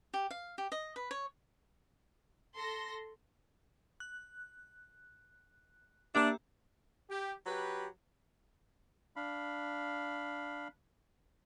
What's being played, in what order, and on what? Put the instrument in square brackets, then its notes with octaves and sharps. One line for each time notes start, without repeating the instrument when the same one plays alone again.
[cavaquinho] G4
F5
G4
D#5
B4
C#5
[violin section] A4 C6 A#6
[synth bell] F#6
[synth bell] A#3 G4 E5 [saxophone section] D4
[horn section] G4
F#3 G4 B4
[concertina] D4 F5 B5